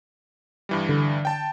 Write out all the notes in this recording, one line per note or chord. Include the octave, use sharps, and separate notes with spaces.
G2 E3 G3
D3
G5 A5